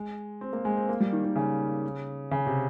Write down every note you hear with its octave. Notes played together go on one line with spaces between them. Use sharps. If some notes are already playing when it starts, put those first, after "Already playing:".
Already playing: G#3
C4
A#3
G#3
C4
A#3
G3
D#3
D#3
C#3
C#3
C3